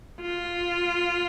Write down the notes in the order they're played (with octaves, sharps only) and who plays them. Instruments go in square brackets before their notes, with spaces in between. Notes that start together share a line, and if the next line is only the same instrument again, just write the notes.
[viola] F4